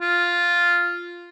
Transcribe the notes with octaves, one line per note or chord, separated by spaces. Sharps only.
F4